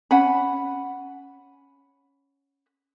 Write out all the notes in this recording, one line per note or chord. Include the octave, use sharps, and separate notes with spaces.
C#4 F#5 G#5 B5